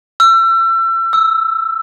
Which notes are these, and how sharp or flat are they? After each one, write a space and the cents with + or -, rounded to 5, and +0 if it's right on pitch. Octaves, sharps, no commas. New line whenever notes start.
E6 +35
E6 -5